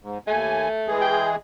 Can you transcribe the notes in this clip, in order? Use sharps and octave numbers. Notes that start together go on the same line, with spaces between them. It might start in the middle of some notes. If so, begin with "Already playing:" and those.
G#2
D#2 A3 G#5
E3 G#3 G#4
G5